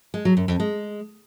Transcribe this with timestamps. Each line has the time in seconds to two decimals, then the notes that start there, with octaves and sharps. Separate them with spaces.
0.14 G#3
0.25 F#3
0.37 F#2
0.48 F2
0.60 G#3